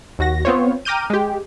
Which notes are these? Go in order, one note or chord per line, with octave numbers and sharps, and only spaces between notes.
D#2 F#4 A#6
B3 C4 F4 C5 C#5
G5 A#5 D6 F6 G6 D#7
G#3 G4